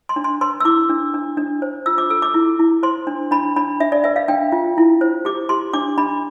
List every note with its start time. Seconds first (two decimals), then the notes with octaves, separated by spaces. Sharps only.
0.09 C6
0.16 D4
0.24 C6
0.41 B4 C6
0.60 E6
0.65 E4 D6
0.89 D4
1.14 D4
1.37 D4
1.62 C5
1.86 F4 E6
1.98 D6
2.10 A4 E6
2.22 D6
2.34 E4
2.59 E4
2.83 C5 C6
3.07 D4
3.31 D4 B5
3.56 D4 B5
3.80 D4 E5
3.92 D5
4.04 B4 E5
4.16 F5
4.28 D4 G5
4.52 F4
4.78 E4
5.01 C5
5.25 G4 D6
5.49 G4 C6
5.73 D4 D6
5.98 D4 B5